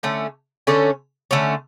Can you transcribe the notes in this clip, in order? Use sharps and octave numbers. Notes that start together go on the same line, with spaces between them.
D3 A3 C#4
D3 A3 C#4
D3 A3 C#4